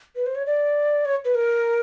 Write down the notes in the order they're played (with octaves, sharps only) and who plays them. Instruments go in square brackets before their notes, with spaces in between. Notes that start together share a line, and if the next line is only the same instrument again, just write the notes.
[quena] B4
C5
C#5
D5
C#5
B4
A#4